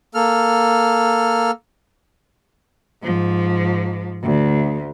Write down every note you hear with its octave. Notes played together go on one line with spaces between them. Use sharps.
A#3 A4 F6
G#2 F3
D2